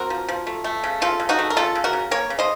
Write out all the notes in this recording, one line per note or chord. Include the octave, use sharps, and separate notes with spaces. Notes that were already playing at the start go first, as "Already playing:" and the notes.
Already playing: C4 F#4 A#4
F3
F3
A3
A3
C#3
C#3 F4 A4
C#3
D#4 F#4
A3
A#4
C#3 F4 A4
C#3
F#4 A#4
C#3
A#3 A#4 C#5
C#3
C5 D#5